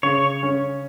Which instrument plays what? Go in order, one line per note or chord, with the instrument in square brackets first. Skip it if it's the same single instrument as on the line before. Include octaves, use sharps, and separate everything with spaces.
[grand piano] C#3 [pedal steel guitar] C#5
[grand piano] C#4